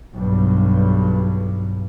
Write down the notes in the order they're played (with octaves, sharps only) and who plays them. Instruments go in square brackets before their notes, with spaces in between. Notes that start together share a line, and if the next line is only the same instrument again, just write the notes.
[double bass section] B1 G2